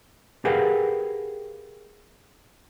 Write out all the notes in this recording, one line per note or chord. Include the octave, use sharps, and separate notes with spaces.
G4 G#4 A#4 B4 F5 F#5